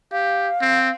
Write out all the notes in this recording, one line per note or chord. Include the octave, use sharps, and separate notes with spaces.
G4 F5
C4